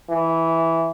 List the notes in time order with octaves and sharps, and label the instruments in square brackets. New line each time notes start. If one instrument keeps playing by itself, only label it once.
[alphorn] E3